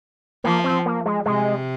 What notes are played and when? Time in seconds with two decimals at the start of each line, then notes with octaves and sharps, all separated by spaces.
0.44 F3 A#3
0.64 C4
0.86 A#3
1.06 G#3
1.26 C3 G#3